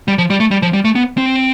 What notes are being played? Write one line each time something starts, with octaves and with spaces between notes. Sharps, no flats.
G3
F3
G3
A3
G3
F3
G3
A3
B3
C4